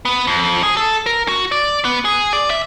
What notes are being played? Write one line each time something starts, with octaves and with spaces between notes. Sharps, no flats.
B3
F2
G#4
A4
A#4
F#4
D5
B3
G#4
D5
E5